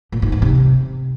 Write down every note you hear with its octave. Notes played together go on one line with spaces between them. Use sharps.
A#2
G#2
E2
C3